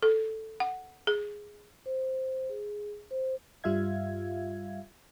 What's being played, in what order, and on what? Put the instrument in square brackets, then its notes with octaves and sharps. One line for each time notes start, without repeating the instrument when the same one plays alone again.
[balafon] A4
F#5
G#4
[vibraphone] C5
G#4
C5
[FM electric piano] G2 G3 F4 E5 F5 G#6